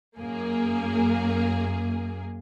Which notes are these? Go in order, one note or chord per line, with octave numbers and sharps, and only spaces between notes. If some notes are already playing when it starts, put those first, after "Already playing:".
F#2 A#3 G#4